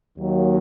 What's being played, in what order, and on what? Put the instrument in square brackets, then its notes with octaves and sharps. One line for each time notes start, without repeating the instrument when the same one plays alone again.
[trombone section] D#2 D#3 F#3 A#3